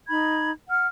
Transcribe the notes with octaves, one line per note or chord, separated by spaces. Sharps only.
D#4 B5 G#6
F#5 F6